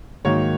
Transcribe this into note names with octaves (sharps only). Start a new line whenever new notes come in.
G#2 D#3 F#3 A#3 C#5